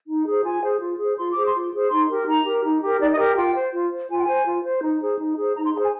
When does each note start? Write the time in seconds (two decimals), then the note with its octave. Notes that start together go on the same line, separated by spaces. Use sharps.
0.08 D#4
0.26 G#4 C5
0.44 F4 G#5
0.62 G#4 C5
0.81 F4
0.99 G#4
1.04 C5
1.18 F4 C6
1.31 D6
1.37 G#4 C5
1.45 C6
1.54 F4
1.73 G#4 C5
1.91 D#4 C6
2.10 G4 A#4
2.27 D#4 A#5
2.46 G4 A#4
2.64 D#4
2.82 G4 A#4
3.00 D#4 D5
3.12 D#5
3.18 G4 A#4
3.37 F4 G5
3.55 C5
3.73 F4
3.91 C5
4.10 F4 G#5
4.19 G5
4.26 C5 G#5
4.46 F4
4.64 C5
4.83 D#4
5.01 G#4 C5
5.19 D#4
5.38 G#4 C5
5.56 D#4 A#5
5.65 C6
5.74 G#4 A#5
5.78 C5
5.83 G#5